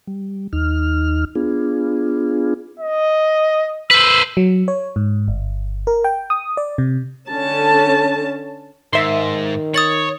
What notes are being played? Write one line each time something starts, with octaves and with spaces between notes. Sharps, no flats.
G3
D#2 D#4 F6
B3 D4 F4 G#4
D#5
B4 C5 E6
F#3
C#5
G#2
G1
A#4
G5
D#6
D5
C3
D3 C#4 A5
G#2 D#3 E5 C6
C#5 D#6 A6 F#7